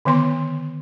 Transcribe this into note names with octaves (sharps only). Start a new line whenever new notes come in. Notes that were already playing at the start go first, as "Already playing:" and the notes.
D3 D#3 B3 C6